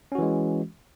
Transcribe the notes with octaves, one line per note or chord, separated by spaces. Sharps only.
E3 G#3 C#4 F#4